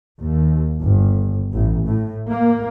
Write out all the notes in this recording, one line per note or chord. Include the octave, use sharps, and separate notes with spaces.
D#2
G1
A1
A2
A#3